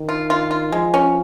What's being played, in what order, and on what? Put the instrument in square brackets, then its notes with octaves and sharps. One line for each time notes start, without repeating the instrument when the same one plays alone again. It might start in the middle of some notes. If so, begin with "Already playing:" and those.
Already playing: [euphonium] D#3
[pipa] F4
F4
F4
[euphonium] F3 [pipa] G#3
[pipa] C#4